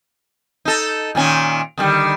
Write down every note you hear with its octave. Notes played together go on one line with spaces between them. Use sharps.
D#4 A4
A#2 D#3 C#4
D3 D#3 G3